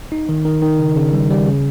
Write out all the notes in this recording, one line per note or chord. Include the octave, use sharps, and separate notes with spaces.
D#4
D#3
D#3
D#3
C#3
C#3
G3
G3
C#3